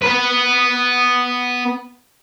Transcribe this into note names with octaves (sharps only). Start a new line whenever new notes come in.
B3 B4